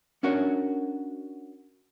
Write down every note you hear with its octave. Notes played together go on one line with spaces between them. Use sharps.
C#4 D4 F#4 A#4 C#5